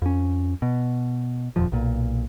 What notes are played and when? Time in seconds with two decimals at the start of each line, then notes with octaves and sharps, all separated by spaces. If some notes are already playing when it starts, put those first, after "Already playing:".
0.02 F2 C#4
0.62 B2
1.56 D#1 F2 F3
1.72 B1 A#2